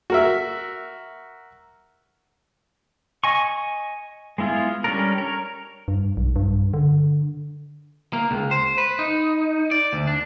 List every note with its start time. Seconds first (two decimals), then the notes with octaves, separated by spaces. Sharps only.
0.10 F#4 A#4 E5
3.24 D#5 G#5 C#6
4.38 G#3 B3 E4 F4 G#4
4.84 G3 C#4 D4 A4 A#4
5.18 A#4 C#5
5.88 G2
6.17 B1
6.36 G2
6.74 D3
8.13 A#3
8.31 C#2
8.51 C5
8.78 B4
8.99 D#4
9.71 D5
9.93 D2
10.07 D4